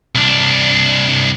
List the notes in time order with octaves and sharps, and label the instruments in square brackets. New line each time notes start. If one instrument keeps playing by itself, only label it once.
[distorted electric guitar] C2 D4